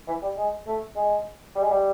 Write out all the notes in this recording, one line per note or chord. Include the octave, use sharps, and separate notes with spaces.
E3
G3
G#3
A3
G#3
G3
G#3
G3